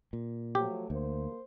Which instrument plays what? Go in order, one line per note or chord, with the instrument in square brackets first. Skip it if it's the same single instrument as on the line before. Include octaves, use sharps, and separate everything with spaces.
[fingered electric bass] A#2
[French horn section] F3 F#3 A3 [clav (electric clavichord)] G4
[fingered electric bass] D2 [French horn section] A#3 C5